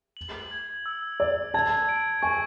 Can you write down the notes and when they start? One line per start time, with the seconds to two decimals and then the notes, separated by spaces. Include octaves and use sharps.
0.17 F#7
0.51 G#6
0.86 E6
1.20 D5 E6
1.54 A5 G#6
1.89 D7
2.22 G#5 C#6